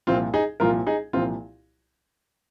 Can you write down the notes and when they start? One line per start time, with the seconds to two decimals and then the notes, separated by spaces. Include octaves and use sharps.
0.07 C2 A#2 F3 C4 F4
0.34 D#4 G#4
0.60 C2 A#2 F3 F4 A#4
0.87 D#4 G#4
1.13 C2 A#2 F3 C4 F4